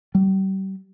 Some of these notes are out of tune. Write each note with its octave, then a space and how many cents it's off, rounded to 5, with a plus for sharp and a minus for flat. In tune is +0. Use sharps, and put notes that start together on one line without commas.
G3 -35